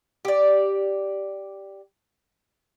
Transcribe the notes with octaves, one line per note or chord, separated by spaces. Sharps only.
G4 D5